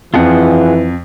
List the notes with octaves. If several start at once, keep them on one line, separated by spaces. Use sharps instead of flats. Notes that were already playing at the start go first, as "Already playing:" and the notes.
F2 E3 F4 G#4 F#5